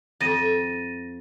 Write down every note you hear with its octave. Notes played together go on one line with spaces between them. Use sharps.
F2 D#5 A6 A#6 D#7